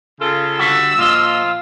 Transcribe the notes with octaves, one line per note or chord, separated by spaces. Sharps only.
C#3 F4 A4
D3 G3 F#4 E6
A#2 F3 F4 D#5